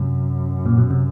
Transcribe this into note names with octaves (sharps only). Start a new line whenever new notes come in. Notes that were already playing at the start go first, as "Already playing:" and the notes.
Already playing: F#2 C3
A#2
B2
C3